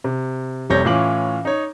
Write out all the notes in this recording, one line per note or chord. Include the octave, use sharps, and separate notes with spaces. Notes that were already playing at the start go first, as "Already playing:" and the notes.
C3
F1 C3 G3 C#5 G6 A#6
A2 E3 C#4 F4 D6 F#7
D#4 C#5